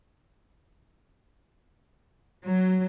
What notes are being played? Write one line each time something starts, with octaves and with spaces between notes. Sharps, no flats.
F#3